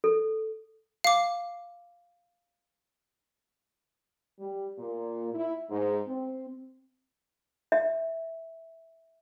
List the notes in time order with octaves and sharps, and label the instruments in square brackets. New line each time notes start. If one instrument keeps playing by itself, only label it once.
[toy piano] A4
[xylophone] F5 D6
[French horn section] G3
A#2
E4
G#2
C4
[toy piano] E5